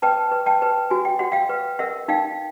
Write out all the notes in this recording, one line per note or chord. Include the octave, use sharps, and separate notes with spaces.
B4 G5 A5
B4
G5 A5
B4
F#4 G#5
G5
F#4 F#5
F5 G5
B4
A#4 E5 F#5
D#4 F5 G5